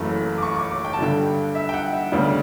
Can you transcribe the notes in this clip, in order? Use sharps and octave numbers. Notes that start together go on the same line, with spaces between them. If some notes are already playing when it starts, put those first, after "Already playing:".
Already playing: F#1 F#2 E3 A3 B5
D6
C#6
D6
D6
G5
A5
G2 D3 G3 G5
E5
G5
F#5
E5
D2 C#3 G3 B3 D4